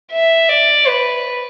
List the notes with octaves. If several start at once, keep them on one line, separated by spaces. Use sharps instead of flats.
E5
D5
B4